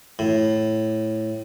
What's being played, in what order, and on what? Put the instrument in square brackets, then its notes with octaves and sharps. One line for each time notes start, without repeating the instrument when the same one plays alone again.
[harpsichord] A2